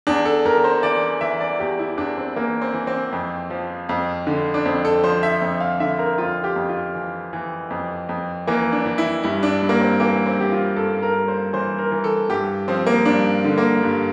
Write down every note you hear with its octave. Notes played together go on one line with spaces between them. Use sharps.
E2 D4
A4
E2 A#4
C5
E3 D5
E3 E5
D5
E2 G4
E4
E2 D4
C4
E3 A#3
C4
E3
C4
F2
F3
F2
D3
D4
F2 C4
A4
F3 C5
E5
F2
F5
D3 E5
A#4
F2 F4
G4
F2
F4
E3
E3
F2
F2
E3 A#3
D4
E3
E4
G2 E4
D4
G2
A#3
C4
E3 A#3
C4
E3 G4
F4
G2 A4
A#4
G2
C5
E3 C5
A#4
E3
A4
G2 G4
F3 C4
A#3
G2 D4
D3
A#3
G2